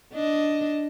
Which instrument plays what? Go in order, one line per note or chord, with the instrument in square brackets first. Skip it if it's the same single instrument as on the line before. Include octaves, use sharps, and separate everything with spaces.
[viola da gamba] D4 D#5